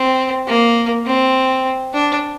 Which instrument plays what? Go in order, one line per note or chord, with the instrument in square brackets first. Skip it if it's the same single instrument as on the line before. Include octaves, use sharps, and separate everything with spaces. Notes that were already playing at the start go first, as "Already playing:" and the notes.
Already playing: [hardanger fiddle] C4
A#3
C4
D4